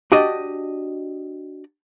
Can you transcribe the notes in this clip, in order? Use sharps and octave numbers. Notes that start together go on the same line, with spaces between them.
D4 F#4 G4 D5 D#5